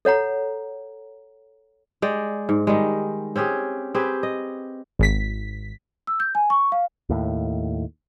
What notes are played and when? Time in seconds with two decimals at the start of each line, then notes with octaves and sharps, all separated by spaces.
0.05 A4 C#5 F#5 A#5
2.02 G#3 D5 G5
2.49 G#2
2.67 D#3 G3 G#3
3.36 C4 C#4 G4 G#4
3.95 C4 G4 G#4 B4
4.23 D#5
4.99 G#1 B6
6.07 E6
6.20 G6
6.35 G#5
6.50 C#6
6.72 F5
7.09 D#2 A2